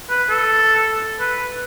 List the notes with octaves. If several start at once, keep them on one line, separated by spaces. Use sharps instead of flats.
B4
A4
B4